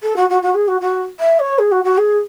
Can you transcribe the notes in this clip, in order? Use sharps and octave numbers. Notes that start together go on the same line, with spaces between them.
A4
F#4
F#4
F#4
G#4
F#4
F#4
E5
C#5
G#4
F#4
F#4
G#4